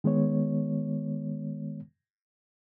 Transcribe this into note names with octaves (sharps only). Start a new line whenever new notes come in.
D#3 G#3 B3 C#5